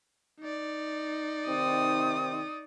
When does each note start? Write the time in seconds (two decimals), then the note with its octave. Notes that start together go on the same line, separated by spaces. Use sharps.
0.40 D#4 D5
1.47 C3 D#3 C4 D#6